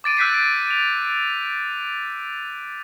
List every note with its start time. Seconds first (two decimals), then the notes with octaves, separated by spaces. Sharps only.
0.04 D6 A6 D7 D#7
0.17 E6 F#6 G6 B6 C7 D7
0.71 F7